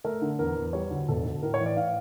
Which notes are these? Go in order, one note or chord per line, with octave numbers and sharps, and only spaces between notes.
A3 A#4
D3
E2 A#4
E2
G3 C#5
D2
E1 A4
D2
A2 A#4
C#5
E3
D5
A2 F5